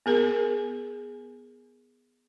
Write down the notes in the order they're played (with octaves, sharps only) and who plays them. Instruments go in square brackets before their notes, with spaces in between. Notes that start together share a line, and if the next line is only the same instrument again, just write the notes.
[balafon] B3 G#4 A#4